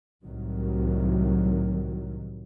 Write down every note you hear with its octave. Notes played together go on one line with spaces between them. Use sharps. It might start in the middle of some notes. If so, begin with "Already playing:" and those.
C2 A2 D#3 F#3